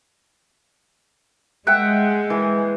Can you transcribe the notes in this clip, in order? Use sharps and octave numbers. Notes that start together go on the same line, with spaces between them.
G#3 E5 F#5 G5
E3